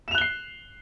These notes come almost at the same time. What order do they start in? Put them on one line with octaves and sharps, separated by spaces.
E7 F7 F#6 G7 C7